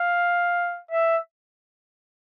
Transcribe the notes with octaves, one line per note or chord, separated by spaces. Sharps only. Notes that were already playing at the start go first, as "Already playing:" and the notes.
Already playing: F5
E5